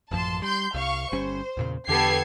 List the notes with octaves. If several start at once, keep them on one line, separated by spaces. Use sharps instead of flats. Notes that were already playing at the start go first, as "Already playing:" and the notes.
A1 F#2 F3 A5 C6
G3 C6 G6
C2 F5 C#6
G1 G3 C#4 C5
E2 A#2 C#3
E2 D3 B3 G4 A4 G#6 C7